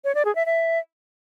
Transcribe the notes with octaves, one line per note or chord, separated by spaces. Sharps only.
C#5
D5
G#4
E5
E5